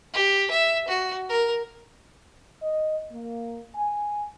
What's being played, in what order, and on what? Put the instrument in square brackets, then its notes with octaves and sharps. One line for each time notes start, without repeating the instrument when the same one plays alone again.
[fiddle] G4
E5
F#4
A#4
[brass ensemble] D#5
A#3
G#5